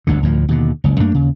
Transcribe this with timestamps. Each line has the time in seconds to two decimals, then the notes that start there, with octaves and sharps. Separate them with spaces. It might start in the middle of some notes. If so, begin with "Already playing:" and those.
0.07 G1 D2 G2 D3
0.23 D2 A2 F3
0.49 D#2 B2 D3
0.84 F#1 C#2
1.00 F#2 A3 A#3 D4
1.14 D#2 C#3